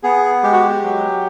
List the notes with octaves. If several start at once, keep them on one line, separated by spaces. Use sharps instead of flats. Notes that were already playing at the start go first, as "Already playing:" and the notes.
B3 G#4
G#3 G4
F#4
G4
F#3